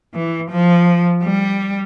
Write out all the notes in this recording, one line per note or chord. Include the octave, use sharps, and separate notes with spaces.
E3
F3
G3